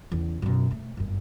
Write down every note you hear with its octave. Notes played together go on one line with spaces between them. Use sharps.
E2 C#3
F#2 B2
A3
G1 F#2